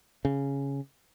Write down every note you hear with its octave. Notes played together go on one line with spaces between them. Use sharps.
C#3